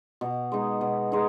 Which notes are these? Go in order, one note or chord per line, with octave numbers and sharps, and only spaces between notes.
B2
G#3 D#4
B2
G#3 D#4